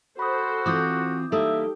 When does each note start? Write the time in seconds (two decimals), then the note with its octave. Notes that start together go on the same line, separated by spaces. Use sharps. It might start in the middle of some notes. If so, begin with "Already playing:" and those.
0.19 F#4 A4 C5 B5 D#6
0.66 E3 C4 F4 D6 D#6 G6
1.32 G3 A#3 D#4 G4 A4 E5 D#6